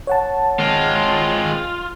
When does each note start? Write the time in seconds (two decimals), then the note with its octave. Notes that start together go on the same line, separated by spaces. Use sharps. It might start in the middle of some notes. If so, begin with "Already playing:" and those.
0.07 C#5 F#5 A5
0.60 G#3 C4 F4